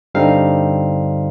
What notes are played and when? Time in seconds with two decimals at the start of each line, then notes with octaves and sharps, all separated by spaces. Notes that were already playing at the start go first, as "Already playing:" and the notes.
0.15 G2 D3 G3 C4 D#4 F5